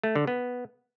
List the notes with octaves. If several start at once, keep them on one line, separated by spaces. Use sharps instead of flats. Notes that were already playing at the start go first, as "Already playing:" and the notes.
A3
D3
B3